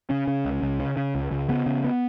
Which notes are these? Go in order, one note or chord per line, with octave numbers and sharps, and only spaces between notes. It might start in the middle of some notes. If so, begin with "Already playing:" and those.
C#3 C#4
C#3
C#2
C#2
C#3
C#3
C#2
C#2
C#3 B3
C#3
B3